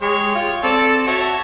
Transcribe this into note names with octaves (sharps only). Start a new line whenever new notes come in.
G#3 G4 C#5
F4
C4 A4 D5
F#4 C#5 E5 A5